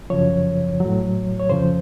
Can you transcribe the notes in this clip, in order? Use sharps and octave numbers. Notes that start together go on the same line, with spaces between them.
F#2 C#3 F3 C#5
A2 F#3
C#5
F2 C#3 F3 C5